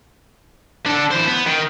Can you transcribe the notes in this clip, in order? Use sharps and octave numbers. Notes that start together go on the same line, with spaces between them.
D4 A4
E3 C5
B3
D#3